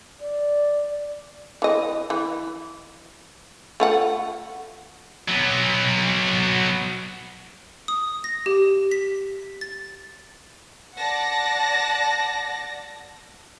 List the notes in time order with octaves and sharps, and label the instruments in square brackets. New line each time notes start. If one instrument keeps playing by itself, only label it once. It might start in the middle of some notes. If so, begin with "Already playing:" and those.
[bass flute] D5
[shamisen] E3 D#5
E3
A3 F4 F#5
[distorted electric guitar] F#3 B3
[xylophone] D#6
A#6
G4
B6
A6
[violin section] D5 F#5 A5 A#6